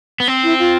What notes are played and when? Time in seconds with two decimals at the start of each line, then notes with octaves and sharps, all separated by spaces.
0.20 B3
0.28 C4
0.43 E4
0.58 F4